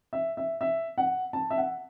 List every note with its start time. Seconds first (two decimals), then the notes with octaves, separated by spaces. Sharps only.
0.13 E5
0.37 E5
0.61 E5
0.98 F#5
1.33 A5
1.50 E5
1.58 F#5